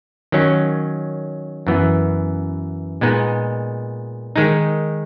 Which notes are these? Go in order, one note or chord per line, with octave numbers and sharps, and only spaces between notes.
D#3 F#3 C#4
F#2 E3 B3
A#2 G#3 B3 D#4
D#3 G#3 D#4